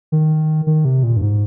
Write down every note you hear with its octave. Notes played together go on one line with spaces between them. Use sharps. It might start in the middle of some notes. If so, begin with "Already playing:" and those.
D#3
D#3
C3
A#2
G2
G#2